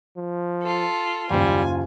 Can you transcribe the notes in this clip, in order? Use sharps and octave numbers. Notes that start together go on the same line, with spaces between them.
F3
F4 A4
F#1 D#2 G3 F4 G#5